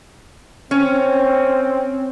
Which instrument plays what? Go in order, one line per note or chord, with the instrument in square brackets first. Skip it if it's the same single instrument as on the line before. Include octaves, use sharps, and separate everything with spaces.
[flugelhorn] C4 [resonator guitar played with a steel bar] C#4